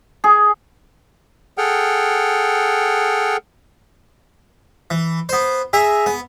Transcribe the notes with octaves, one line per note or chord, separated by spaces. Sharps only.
G#4
G#4 A4 F#5 G5 F6
E3
B3 C5
G#4 E5 A#5
B3